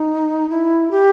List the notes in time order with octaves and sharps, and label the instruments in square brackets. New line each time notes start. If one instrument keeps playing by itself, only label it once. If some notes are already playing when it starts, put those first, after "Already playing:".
Already playing: [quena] D#4
E4
G4